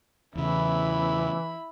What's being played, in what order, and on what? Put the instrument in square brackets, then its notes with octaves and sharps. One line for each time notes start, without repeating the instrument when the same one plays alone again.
[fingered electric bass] E2 C#3 [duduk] E3 [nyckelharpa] E4 B5